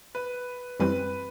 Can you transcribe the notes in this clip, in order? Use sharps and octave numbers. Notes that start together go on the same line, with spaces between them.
B4
F#2 E3 G3 C4 B4